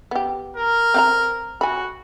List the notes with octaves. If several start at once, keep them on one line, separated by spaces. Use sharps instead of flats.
B3 G4
A#4
C4 F#5 A#5
F#4 G#5 B5